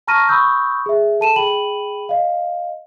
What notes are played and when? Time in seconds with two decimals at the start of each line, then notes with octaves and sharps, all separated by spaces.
0.07 A5 A#5 C#6 F6 A#6 D#7
0.29 B5 C#6 D#6 E6 G6
0.86 G#4 E5
1.20 A4 A5 D#7 E7
1.36 G#4 G5 B5 D#7 F#7
2.09 D#5 F5